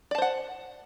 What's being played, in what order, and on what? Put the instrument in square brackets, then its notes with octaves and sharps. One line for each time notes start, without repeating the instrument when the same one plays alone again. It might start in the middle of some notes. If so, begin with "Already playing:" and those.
[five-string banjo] D5
A5
C5
F#5